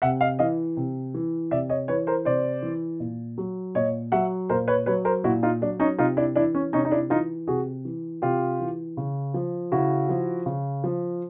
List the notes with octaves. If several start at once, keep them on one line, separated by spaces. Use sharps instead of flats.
C3 E5 F#5
D#5 F5
E3 D#5 F5
C3
E3
C3 D5 E5
C#5 D#5
E3 B4 C#5
A#4 C5
C3 C5 D5
E3
A#2
F#3
A#2 C#5 D#5
F#3 E5 F#5
A#2 A#4 C5
B4 C#5
F#3 B4 C#5
A#4 C5
A#2 E4 F#4
D#4 F4
F#3 D4
C#4 D#4
C3 D#4 F4
D4 E4
E3 D4 E4
C#4
C3 C#4 D#4
D#4
D4 E4
E3 D#4 F4
C3 F#4 G#4
E3
C3 F4 G4
E3
C#3
F3
C#3 E4 F#4
F3
C#3
F3